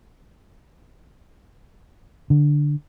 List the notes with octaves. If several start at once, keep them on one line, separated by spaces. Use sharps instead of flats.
D3